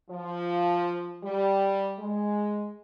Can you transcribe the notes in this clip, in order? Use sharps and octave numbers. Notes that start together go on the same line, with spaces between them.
F3
G3
G#3